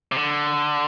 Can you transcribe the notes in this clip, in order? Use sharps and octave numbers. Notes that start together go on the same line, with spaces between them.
C3
D3